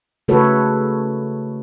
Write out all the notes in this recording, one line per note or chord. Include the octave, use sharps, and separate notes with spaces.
C#3 A3 F#4 A4 B4 C#5